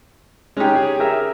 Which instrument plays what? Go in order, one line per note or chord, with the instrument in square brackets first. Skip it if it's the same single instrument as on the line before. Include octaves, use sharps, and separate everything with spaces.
[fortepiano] G#3 D#4 [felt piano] C#4 G4
[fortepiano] G#4
G#4 A#4 E5